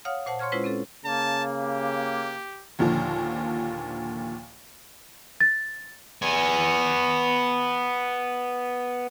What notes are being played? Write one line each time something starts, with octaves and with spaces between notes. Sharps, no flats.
C#5 F5 F#5 D#6 F6
A#2 C5 F#5 A5
C#5 C6 C#6 F6 G#6
G#3 C#4 E4 F4 B4 C5
C4 C#4 A4
C#3 A#3 A5
G4
D#2 A#2 D3 F3
A6
B3 G#5